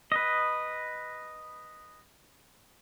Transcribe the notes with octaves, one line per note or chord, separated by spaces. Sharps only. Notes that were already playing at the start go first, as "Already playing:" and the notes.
B4 D#5